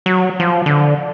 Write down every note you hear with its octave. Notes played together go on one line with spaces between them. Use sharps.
F#3
F3
D3